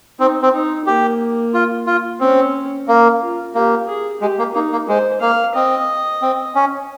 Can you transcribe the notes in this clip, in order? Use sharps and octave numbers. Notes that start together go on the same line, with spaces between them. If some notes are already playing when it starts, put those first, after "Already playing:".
C4 D#4
C4
D#4
A#3 G4
F4
F4
C4 C#4
A#3
F4
A#3 G4
G#4
G#3 G4
A#3
A#3 D#4
A#3
G#3 C5
A#3 F5
C4 D#5
C4
C#4